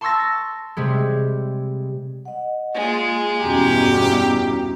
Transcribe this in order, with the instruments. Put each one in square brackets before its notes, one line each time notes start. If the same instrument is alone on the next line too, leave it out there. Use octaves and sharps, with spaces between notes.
[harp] A5 C6 C#6 E6 A6 A#6
C3 G3 G#3
[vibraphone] D#5 F#5
[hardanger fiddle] G#3 [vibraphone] A#3 [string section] F4 G#4
[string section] E2 G2 B2 [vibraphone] C#4 F#4 A#5 [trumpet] G4